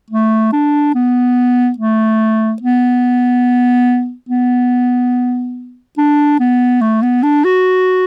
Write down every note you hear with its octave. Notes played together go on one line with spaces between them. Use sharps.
A3
D4
B3
A3
B3
B3
D4
B3
A3
B3
D4
F#4